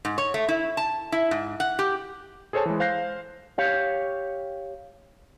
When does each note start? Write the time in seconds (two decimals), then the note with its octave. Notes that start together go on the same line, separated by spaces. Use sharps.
0.05 G#2
0.18 C#5
0.34 A3
0.48 E4
0.77 A5
1.12 E4
1.31 G#2
1.60 F#5
1.79 G4
2.53 G#4 A4 C5 C#5 G#5 A5
2.66 E3 G#3
2.80 C5 F5 F#6 G6 A#6 C7
3.58 G4 C#5 F5